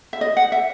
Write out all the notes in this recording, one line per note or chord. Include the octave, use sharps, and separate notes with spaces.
E5
D#5
F#5
E5